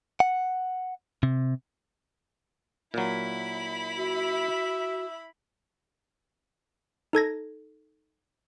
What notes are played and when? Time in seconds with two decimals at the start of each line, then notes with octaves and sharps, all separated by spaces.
0.20 F#5
1.23 C3
2.94 A#2 F#3 E4 B5
3.96 F#4 E5
7.13 D#4 A4 G#6 A#6